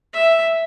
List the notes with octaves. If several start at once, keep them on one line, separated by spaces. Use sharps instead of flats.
E5